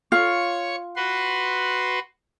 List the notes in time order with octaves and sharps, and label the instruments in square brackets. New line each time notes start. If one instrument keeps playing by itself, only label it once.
[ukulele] F4 [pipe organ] C#5 C#6
[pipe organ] F#4 B4 C6